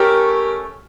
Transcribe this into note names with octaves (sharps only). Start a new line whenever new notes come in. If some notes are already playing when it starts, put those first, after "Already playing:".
Already playing: A3 C#4 G4 A#4